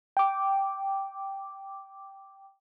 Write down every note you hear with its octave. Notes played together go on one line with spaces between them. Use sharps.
G5 D6